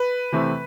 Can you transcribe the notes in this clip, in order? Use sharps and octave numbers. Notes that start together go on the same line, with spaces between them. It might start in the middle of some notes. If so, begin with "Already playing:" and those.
Already playing: B4
C3 E3 A3 C4